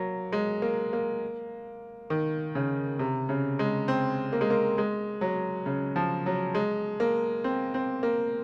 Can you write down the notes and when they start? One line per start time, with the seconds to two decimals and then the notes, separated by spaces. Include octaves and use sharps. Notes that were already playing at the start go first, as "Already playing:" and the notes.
Already playing: F#3 A#3
0.32 G#3
0.62 A#3
0.93 A#3
2.10 D#3
2.55 C#3
2.99 C3
3.29 C#3
3.59 G#3
3.88 C4
4.32 A#3
4.41 G#3
4.50 A#3
4.78 G#3
5.21 F#3
5.66 C#3
5.96 F3
6.26 F#3
6.55 G#3
7.00 A#3
7.44 C4
7.74 C4
8.03 A#3